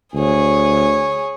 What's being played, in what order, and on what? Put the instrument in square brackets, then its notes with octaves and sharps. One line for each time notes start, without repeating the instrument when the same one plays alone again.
[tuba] D2 [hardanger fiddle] G#4 C#5